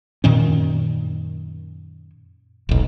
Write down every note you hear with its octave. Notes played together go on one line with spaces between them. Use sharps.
F#2 A#2 D#3 C#4
E1 B1